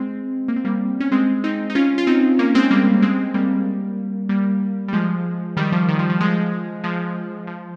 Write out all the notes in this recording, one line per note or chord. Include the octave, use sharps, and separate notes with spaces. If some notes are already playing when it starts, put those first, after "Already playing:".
Already playing: G#3 C4
A#3
C4
G3 A#3
C#4
G#3 C4
C4 D#4
D#4
C#4 F4
F4
C4 D#4
A#3 C#4
G#3 C4
G3 A#3
G#3 C4
G3 A#3
G3 A#3
G3
F3 G#3
D#3 G3
F3
D#3
F3
F3
F3 G#3
F3 G#3
F3